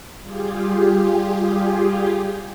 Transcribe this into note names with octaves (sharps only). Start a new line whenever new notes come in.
G3 F4 G4 G#4